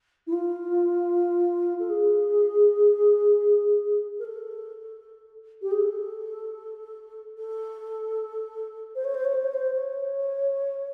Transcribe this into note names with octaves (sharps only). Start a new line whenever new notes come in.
E4
F4
A4
G#4
A#4
A4
G4
G#4
A4
A4
C5
C#5
C5
C#5
C5
C#5
C5
C#5